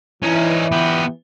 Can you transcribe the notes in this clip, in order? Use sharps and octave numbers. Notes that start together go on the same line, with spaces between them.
E3 C#4 D#4
B3 G4